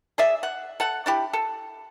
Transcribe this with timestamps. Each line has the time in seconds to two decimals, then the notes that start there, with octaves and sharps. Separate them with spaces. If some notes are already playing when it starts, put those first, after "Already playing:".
0.18 G#4 D5 E5
0.43 F#5
0.80 A4 F#5
1.06 D4 E4 G4
1.33 A4